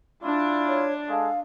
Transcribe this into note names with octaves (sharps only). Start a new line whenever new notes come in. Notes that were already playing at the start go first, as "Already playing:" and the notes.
D4 E4 F4
C#5
G#3 A4 F5